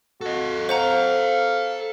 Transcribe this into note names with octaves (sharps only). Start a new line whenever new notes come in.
F#4 A4 D#5
C5 F5 F#5 A#5